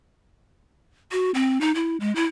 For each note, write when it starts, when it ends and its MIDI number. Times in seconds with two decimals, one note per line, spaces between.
1.12 1.31 66
1.34 1.61 60
1.61 1.73 63
1.75 1.97 64
2.00 2.14 56
2.16 2.25 64